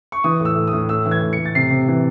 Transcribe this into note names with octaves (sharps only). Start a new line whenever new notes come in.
C#6
E3 D#6
A2
E6
A2
D#6
A2
A2 E6
E3
G#6
A2
A2 C#7
A6
C3 C7
C3
E3